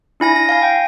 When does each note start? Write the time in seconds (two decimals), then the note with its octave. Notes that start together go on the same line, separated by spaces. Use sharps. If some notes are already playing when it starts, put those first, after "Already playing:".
0.20 D4 E4 G#5 A#6
0.36 A#6
0.49 F5 G#5
0.62 G5